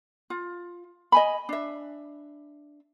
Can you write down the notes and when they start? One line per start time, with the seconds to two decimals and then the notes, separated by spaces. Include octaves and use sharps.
0.30 F4
1.12 D#5 G#5 B5
1.49 D4 E5